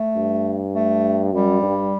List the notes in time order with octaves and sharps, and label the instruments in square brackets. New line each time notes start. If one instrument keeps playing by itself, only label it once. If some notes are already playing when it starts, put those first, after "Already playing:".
Already playing: [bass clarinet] A3
[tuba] G2
[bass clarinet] A3
[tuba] F#2 [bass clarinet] G3
[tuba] G2